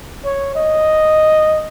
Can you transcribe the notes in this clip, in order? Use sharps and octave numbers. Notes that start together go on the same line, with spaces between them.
C#5
D#5